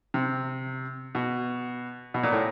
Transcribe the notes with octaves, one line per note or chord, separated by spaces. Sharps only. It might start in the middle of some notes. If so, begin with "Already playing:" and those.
C3
B2
B2
A#2
A2